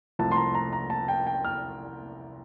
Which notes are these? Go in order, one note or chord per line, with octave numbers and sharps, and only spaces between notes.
C2 C3 F3 A3 A5
C6
A#5
A#5
A#5
A5
G5
G5
F6